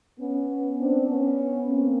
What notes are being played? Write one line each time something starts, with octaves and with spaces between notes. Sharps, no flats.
B3 C#4
C4 D4
B3 C#4
A#3 C4